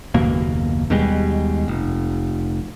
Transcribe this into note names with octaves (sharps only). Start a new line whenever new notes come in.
F#1 D#2 B2 A#3
D#2 B2 G3 G#3
F1